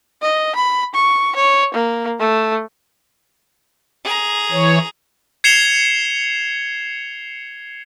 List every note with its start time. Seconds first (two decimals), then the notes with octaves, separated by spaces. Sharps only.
0.22 D#5
0.55 B5
0.94 C#6
1.36 C#5
1.74 A#3
2.19 A3
4.04 G#4 A#5
4.51 E3 C#5
5.44 G#6 C7 C#7 E7 F7 G7